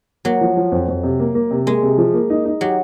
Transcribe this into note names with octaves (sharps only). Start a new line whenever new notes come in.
F#3 A#3
F3
F3
F2
F2
C3
A#3
A#3
C3
G#3 A#3
C3
F3
A#3
D#4
D#4
F#3 G4